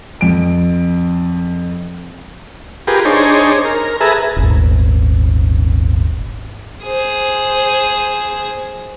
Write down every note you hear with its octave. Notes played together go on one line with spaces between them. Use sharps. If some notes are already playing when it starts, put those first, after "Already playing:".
F2 D7
F4 G4 G#4 A#4 B4
D4 D#4 G#4 C5 C#5
A#4
G#4 A4 B4 E5 A#5
D#1 G#1
G#4 C5